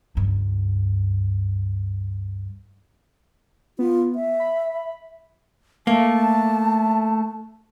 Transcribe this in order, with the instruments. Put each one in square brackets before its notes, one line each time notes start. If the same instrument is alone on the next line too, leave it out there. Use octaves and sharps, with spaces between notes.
[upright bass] C#2 G2
[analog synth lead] B3 [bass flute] F4
[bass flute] E5
[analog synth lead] B5
[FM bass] A3 [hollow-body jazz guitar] A#3 [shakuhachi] A5